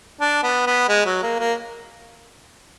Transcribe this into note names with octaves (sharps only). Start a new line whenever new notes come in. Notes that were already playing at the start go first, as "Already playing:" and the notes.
D4
B3
B3
G#3
F#3
A#3
A#3